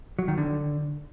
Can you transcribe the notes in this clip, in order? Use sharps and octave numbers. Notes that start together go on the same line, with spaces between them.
F#3
D#3
D3